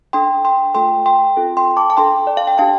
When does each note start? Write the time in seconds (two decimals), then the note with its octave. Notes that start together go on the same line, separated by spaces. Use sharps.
0.13 D4 A4 G5 C6
0.45 G5 C6
0.74 A3 F4 A4 G5 C6
1.06 G5 C6
1.37 C4 F4 A4
1.57 G5 C6
1.77 A5 D6
1.90 A5
1.97 D4 A4 G5 C6
2.27 D5
2.37 F5
2.47 G5
2.58 D4 G4 F5 A5